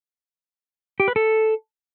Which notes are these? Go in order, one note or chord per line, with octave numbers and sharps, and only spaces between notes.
G4
B4
A4